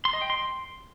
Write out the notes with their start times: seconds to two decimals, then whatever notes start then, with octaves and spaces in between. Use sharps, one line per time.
0.05 C6
0.13 D#5
0.22 G5
0.30 C6